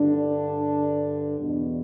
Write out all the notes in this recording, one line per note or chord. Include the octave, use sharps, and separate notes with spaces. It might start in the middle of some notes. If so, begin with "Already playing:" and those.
Already playing: G2 D3 D4
E2 B2